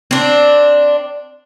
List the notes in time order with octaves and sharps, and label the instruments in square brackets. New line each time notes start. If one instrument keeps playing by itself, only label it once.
[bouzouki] C4 D4